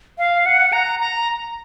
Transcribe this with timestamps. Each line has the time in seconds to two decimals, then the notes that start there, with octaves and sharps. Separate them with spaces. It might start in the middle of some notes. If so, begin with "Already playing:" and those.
0.18 F5
0.46 F#5
0.73 A#5
0.99 A#5